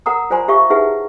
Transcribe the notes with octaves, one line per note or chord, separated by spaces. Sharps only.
A#4 F#5 A#5 D#6
F4 C5 D5 G#5 A#5 C6
G4 E5 F5 C#6
D#4 E4 G#4 B4 E5 F#5